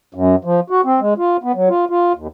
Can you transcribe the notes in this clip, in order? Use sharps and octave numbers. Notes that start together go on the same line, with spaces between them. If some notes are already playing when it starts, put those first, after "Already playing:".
F#2
F3
F#4
C4
G#3
F4
B3
F#3
F4
F4
D#2